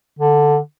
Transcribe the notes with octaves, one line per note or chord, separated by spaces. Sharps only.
D3